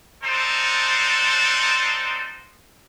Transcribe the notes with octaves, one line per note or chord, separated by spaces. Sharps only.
C4 D4 D#4 A4 C5